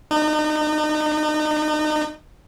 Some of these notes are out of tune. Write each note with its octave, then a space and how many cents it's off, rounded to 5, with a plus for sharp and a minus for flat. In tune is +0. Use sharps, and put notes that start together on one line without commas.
D#4 -35